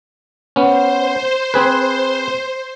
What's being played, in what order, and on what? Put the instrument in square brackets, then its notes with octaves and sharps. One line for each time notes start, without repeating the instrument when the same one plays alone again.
[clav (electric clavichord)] B3 C#4 [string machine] C5
[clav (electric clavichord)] C4 G#4 B4